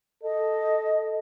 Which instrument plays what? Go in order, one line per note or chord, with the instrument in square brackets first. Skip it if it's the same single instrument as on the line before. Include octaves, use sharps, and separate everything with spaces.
[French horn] A4 [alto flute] D#5